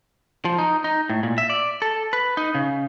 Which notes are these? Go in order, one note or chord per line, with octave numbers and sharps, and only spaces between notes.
F3
D#4
D#4
A2
A#2
E5
D5
A4
B4
D#4
C#3